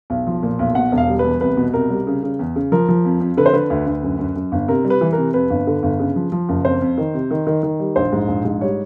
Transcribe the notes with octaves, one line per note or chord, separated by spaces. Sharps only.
B1
F3
A#2
B1
B2 F#5
E1
F5
G3
B4
E2
C2 B4
B2
C2 A#4
G3
C#3
C#3
E2
C#3
F3 A#4
F3
F2
F2
D3 B4
C5
D3 B4
D2
D2
F#2
F#2
F#2
G1
C3 A#4
G3
B4
E3
A#4
C3
F2 B4
G1
D3
G1
C#3
F3
F3
F#1
F2 C5
F2
D#3
C3
D#3
D#3
D#3
G3
A#1 C5
G#2
A#1
G#2
G3 C#5